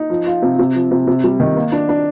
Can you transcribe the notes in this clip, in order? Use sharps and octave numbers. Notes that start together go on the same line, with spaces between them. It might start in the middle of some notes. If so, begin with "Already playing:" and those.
Already playing: D#4
F3
F4
C3
C3
F3
C3
C3
G3
D#3
A#3
D4
D4